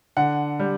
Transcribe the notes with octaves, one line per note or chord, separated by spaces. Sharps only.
D3 F#5
G3